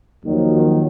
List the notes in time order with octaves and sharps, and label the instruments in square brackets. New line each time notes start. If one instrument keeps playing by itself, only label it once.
[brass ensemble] D#2 D#3 F3 F#3